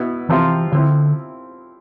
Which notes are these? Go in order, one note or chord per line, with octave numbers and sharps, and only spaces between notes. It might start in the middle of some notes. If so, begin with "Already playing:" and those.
Already playing: B2 B3 E4
C3 E3 F3 C4 F4
D3 F3 C4 E4